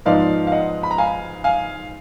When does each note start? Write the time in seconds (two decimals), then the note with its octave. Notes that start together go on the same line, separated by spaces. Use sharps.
0.05 G#2 F3 B3 D#4 D5 F5
0.47 F5
0.52 D#5 F#5
0.83 B5
0.91 A#5
0.98 F5 G#5
1.44 F5 G#5